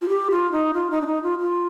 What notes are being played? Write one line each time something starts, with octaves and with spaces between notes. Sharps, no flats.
F4
G4
F4
D#4
F4
D#4
D4
D#4
F4
F4